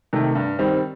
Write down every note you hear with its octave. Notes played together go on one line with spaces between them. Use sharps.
C3 D#3 A3
G2
D#3 G3 C4